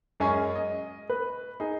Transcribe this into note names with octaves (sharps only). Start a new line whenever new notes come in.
F#2 G#3 C#4 G#5
D#5
B4
D#4 G#4